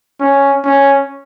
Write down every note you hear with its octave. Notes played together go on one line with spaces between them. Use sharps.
C#4
C#4